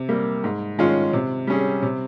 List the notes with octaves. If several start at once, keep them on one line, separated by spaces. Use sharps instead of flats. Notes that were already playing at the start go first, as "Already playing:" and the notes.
Already playing: C3
G3 A#3
G#2
D#3 G#3 C#4 F4
C3
G3 C#4 G#4
C3